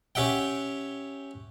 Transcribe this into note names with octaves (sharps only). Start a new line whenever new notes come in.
C#4 G4 E5 F#5 G5